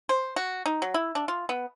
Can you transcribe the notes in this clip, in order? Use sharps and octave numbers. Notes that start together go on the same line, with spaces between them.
C5
F#4
D#4
F#3
E4
D4
F4
B3